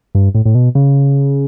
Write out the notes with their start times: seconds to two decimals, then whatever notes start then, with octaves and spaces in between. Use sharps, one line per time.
0.15 G2
0.35 A2
0.45 A2
0.55 B2
0.75 C#3